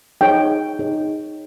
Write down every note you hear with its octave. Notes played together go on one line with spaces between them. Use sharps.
D#4 G#4 C#5 G5
D#4 G#4 C#5